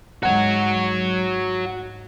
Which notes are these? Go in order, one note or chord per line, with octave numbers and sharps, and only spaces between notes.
G#2 F#4 C#5 F#5